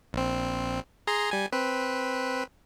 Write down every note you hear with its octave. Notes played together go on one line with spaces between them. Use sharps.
A#1 C4
G#4 A#5 C6
G3 G#5
C4 B4